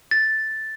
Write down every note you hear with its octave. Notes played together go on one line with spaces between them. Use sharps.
A6